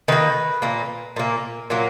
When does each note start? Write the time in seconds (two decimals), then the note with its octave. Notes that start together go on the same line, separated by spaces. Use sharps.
0.08 D#3 A#3 B4
0.62 A#2 A#3
1.16 A#2 A#3
1.70 A#2 F#3 A#3